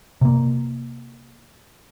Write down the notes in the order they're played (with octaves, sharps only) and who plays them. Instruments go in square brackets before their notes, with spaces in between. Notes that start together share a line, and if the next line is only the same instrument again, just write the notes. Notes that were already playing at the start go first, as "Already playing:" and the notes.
[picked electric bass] C3 A#3